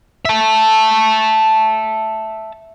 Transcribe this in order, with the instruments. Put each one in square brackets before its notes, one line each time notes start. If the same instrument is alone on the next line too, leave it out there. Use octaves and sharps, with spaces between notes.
[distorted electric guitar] E5 A5